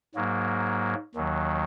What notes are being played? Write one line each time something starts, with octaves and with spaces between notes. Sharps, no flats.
G#2 F#3 A#3
D#2 D#3 F#3